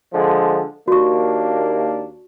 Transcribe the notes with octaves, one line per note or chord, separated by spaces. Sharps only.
D3 F3 G#3
D#2 A#3 D4 F#4 C#6